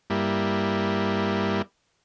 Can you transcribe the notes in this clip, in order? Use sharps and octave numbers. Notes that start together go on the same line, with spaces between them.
G2 G3 A#3 E4